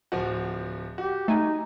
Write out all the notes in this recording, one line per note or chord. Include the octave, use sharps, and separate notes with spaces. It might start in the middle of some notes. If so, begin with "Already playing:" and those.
D1 F3 F#4
F#4 G4
A3 D#4 G#5